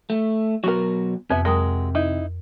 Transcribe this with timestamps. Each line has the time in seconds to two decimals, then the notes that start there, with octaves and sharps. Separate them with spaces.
0.10 A3
0.64 B2 F#3 F#4 A#4
1.30 F2 C3 B3 E5
1.45 F#3 G#3 A#4 G5 D#6
1.95 D#4 E4